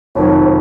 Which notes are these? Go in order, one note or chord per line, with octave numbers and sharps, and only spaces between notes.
F1 F2 D#3 F#3 C#5